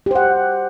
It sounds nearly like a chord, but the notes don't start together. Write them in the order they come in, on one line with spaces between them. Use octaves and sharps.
G4 C5 F#5